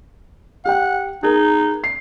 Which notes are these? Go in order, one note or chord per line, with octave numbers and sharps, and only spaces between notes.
G4 F#5 G5
D#4 G#4 A#4
C7